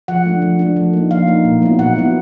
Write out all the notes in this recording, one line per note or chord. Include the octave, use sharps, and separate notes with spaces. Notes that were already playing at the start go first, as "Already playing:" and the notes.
F3 F#5
A3 D4
F3
A3 D4
F3
A#3 D#4
F3 F5
A#3 D#4
A#2
F#3 B3 E4
A#2 F#5
F#3 B3 E4